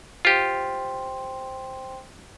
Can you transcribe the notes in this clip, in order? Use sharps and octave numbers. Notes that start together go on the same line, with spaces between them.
F4 G4 C5 G5 C6